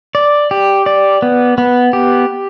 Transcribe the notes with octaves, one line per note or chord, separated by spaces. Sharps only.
D5
G4
D5
B3
B3
G4